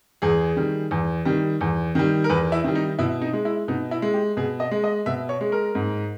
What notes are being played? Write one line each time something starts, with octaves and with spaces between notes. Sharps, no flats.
E2 G#4
D#3 G3
E2
D#3 G3
E2
D#3 G3
A#4
E2 B4
E4
D#3 G3
D#4
B2 E4
D#4
G#3
E4
B2 D#4
E4
G#3
G4
B2 G#4
D#5
G#3
D#5
B2 E5
C#5
G#3
A#4
G#2